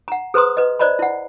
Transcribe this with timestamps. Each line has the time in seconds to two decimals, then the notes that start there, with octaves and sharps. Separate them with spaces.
0.08 F#5 A#5
0.34 G#4 B4 C5 A#5 C6 D#6
0.57 B4 D#5
0.79 C5 D5 D#5 A#5 B5
0.99 E4 F#5